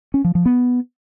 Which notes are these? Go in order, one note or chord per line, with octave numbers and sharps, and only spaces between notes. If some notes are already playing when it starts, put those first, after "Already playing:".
C#4
F3
F3
B3